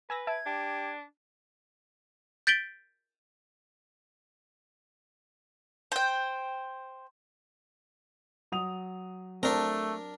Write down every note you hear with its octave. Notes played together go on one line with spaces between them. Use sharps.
B4 G#5 E6 A#6
E5 A5 G#6 D7
D4 G4
G6 A6 B6 D7 F#7 G7
C5 G5
F#3 D#6 F7
A3 C4 D4 A#4